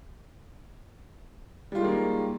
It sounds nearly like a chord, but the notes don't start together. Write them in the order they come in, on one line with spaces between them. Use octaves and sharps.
G3 F4 G#3 D#3 A#3